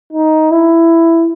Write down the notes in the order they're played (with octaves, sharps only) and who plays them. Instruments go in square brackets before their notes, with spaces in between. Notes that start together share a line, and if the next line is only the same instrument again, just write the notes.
[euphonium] D#4
E4